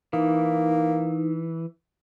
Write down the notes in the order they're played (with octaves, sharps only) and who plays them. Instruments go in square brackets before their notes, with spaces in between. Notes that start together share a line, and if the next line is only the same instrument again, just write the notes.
[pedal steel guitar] E3 [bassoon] A#3 [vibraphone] D#4